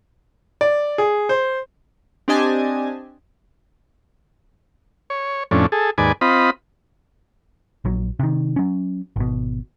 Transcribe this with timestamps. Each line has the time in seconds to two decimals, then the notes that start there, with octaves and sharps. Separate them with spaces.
0.61 D5
0.98 G#4
1.29 C5
2.28 C4 D4 G4 D#5 G#5 A5
5.10 C#5
5.51 F2 A2 C#4 D4
5.72 G#4 A4
5.98 D#2 G#2 B4 D5 G#5
6.21 C4 F4 D#5 B5
7.85 A#1 F#3
8.19 C3 D#3
8.56 F#3 C#4
9.16 G#1 B2